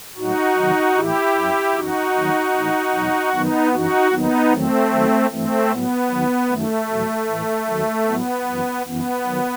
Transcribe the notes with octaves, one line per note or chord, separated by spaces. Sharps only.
A2 F#3 D#4 F#4
E2 C3 D#3 F#3
A2 E3 E4 G4
F#2 F#3
F#2 E3 D#4 F#4
D#2 D#3 F#3
A2 E3
E2 B2 F#3
F#2 D#3 F#3 B3 D#4
F#2 E3 D#4 F#4
D#2 D#3 F#3 B3 D#4
E2 D#3 F#3 A3 C4
D#2 D#3 F#3
G2 E3 A3 C4
A2 F#3 B3
D#2 D#3 F#3
F#2 D#3 F#3 A3
E2 B2 F#3
A2 E3
D#2 D#3 F#3
A2 F#3 B3
F#2 E3
F#2 E3 B3
D#3 F#3